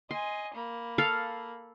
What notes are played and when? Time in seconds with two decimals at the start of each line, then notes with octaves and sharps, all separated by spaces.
0.11 D#5 G#5 C6
0.54 A#3 B5
0.98 A4 F5